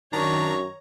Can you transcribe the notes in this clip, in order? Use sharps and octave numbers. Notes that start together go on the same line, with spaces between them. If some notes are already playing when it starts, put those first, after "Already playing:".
F#2 D#3 D4 C#5 A#5 C#6